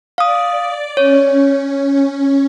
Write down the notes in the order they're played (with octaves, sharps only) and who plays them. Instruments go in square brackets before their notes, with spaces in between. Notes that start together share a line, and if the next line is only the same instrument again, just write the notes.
[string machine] D5 [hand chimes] F5 D#6
[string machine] C#4 [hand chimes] C#5